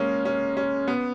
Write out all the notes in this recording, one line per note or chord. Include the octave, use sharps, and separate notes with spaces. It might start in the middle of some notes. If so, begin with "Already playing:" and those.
Already playing: G#3 A#3 C#4
C#4
C#4
B3